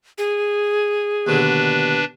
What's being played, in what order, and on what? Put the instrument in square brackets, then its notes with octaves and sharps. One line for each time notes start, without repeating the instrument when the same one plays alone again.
[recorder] G#4
[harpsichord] D#2 B2 D3 [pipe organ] D4 B4